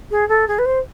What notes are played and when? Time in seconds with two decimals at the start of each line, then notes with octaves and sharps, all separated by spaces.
0.11 G#4
0.29 A4
0.48 G#4
0.58 B4
0.65 C5